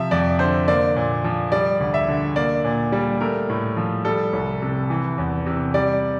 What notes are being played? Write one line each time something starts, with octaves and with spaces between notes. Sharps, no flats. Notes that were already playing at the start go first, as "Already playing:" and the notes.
Already playing: C3 F3 E5
F2 D5
D3 C5
A#3 D5
A#2
F3
G3 D5
D2
E5
D3
A#3 D5
A#2
G3
A3 A#4
A2
F3
G3 A4
C2
C3
E3
E2
C3
G3 D5